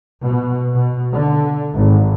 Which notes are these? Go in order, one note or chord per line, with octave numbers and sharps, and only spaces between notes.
B2
B2
D3
G#1